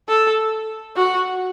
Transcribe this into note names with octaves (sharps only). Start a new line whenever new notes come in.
A4
F#4